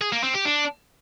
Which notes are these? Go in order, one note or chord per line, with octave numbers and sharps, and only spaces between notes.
G#4
A#3
C4
G4
D4